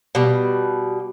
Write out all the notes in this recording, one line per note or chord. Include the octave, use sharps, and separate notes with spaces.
B2 G3